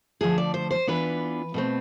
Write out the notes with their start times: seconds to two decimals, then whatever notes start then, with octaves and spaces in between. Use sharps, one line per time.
0.21 D3 F3 A3 G#4
0.38 D5
0.54 C5
0.71 C5
0.87 E3 B3 D4 F4 B4
1.54 B2 A3 C4